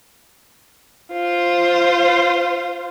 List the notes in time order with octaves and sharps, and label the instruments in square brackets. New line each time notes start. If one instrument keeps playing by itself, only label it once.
[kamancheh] F4 C5